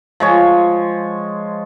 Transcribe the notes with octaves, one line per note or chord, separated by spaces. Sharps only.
F3 G#3 C#5